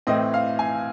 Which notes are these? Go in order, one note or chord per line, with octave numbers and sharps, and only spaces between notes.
A2 E3 A3 C4 D#5
F5
G#5